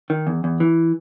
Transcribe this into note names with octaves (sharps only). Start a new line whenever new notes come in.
D#3
E2
E2
E3